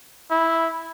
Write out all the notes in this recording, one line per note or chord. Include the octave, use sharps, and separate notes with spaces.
E4